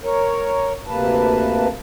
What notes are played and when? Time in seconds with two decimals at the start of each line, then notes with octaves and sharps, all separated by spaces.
0.04 A#4 C#5
0.87 D2 C3 A#3 B4 A5